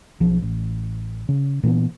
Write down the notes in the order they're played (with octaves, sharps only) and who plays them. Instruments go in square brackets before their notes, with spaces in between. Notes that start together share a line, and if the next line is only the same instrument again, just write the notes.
[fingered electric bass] B1 F3
A1
C#3
A#2 E3 A#3 B3